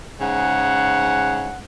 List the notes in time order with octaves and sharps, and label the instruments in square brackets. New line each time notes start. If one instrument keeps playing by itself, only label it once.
[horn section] G#2 C#3 F#5